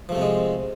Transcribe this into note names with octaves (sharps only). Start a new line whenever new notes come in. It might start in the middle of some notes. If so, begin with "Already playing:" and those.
C3 F3 G#3 A3 C4